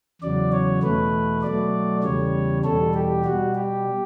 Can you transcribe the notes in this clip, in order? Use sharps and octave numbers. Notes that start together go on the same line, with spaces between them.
E2 C#3 F#3 D5
C#5
E2 B2 A3 B4
B2 F#3 A3 D5
E2 C#3 G3 C#5
E2 B2 G3 A4
G4
B2 G3 F#4
G4